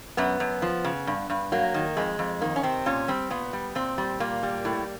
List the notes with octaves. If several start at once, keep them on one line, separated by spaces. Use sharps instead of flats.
F#2 B3
F#2
F3
C#3
G2
G2
F#3 A#3
D#3
F2 G#3
F2
D#3 A#3
C#4
C3 C4
A#2 C#4
G3 C4
A#2 B3
G3
A#2 C4
G3
A#2 A#3
G3
A2